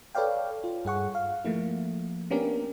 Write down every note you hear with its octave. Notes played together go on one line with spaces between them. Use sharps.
A4 B4 C#5 D5 F5 G5
F4
G2 G#4 F#5 C#6
F5
F3 A3 A#3 E4
A#3 B3 C#4 D4 G4 A#4